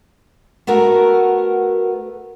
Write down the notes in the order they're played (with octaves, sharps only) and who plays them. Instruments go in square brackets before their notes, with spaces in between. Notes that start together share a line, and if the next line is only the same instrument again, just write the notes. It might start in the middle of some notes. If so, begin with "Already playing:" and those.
[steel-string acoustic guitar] A3 B3 F#4 A#4